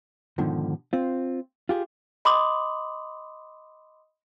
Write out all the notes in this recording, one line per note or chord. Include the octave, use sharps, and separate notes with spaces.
G#2 B2 D3 D#3 F3
C4 F4
F4 G4 G#4
D#5 B5 C6 D6 D#6 F#7